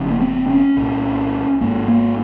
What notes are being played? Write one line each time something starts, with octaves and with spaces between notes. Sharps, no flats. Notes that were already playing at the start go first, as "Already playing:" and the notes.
Already playing: F1 F2 C#3
A#3
C4
C#4
C2 A#2
G#1 G#2 A#3
A#3